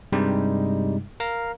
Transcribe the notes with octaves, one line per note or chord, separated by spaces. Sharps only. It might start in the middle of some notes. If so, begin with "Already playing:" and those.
G2 C3 G3 G#3 D#4
A#4 F5 A#5